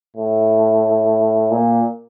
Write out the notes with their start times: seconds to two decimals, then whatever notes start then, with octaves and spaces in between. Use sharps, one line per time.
0.16 A2
1.52 A#2